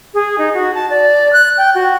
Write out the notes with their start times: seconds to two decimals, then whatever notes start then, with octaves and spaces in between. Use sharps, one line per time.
0.14 G#4
0.38 D#4
0.54 F#4
0.74 A5
0.90 D5
1.33 F#6
1.58 G5
1.75 F#4